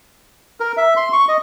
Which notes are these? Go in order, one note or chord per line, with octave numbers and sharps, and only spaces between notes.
A#4
E5
C6
C#6
D#5